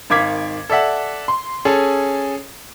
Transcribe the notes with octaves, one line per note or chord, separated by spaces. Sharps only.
G#1 D#3 F5 D6 G#6 B6
A4 D5 E5 F#5
C6
C#4 G#4 A4